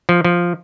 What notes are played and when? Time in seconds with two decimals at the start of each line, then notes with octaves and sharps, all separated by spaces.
0.09 F3
0.24 F3